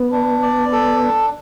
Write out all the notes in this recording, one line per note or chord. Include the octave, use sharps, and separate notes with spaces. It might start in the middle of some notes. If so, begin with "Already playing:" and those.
Already playing: B3
D4
D5
A4
D4